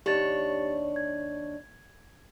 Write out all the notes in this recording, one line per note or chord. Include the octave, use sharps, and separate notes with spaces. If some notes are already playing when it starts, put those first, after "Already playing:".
D#2 D4 G4 C#5 A6
G#6